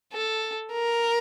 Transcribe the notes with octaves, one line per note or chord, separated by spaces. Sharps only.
A4
A#4